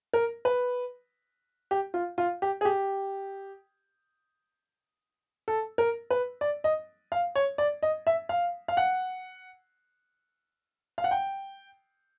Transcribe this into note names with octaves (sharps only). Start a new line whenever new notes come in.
A#4
B4
G4
F4
F4
G4
G#4
G4
A4
A#4
B4
D5
D#5
F5
C#5
D5
D#5
E5
F5
F5
F#5
F5
F#5
G5